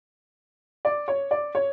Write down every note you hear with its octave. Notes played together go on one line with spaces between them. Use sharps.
D5
C#5
D5
C#5